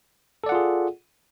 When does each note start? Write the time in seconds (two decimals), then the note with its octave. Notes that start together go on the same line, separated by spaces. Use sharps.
0.44 A4
0.46 D5
0.49 F#5
0.52 F4
0.55 G#4